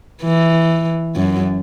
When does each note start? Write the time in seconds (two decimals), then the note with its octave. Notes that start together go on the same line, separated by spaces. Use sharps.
0.22 E3
1.16 F#2